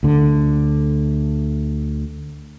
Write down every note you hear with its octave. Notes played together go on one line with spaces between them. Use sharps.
D2 D3